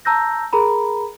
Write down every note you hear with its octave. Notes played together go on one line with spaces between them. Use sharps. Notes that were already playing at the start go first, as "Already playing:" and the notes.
A5 A#5 E6 G6 A#6
G#4 A#4 A#5 B5